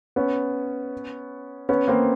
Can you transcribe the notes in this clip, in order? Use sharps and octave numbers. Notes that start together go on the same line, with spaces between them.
B3 C#4
B3 C#4
A#3 C4